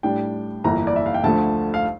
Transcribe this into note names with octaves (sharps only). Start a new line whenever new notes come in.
A2 G3 D4 G5
G1 F2 E3 A#3 A#5
D5
E5
F5
G5
D2 D3 F3 A3 A5
F5